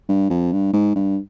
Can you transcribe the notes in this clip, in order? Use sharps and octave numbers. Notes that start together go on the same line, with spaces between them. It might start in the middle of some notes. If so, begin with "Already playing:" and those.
G2
F2
G2
G#2
G2